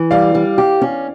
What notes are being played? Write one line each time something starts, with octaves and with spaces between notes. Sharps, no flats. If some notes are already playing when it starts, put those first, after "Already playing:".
Already playing: E3
G3 D5 F5
G3
G4
C#4